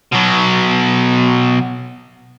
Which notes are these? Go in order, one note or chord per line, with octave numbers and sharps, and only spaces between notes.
B2 F#3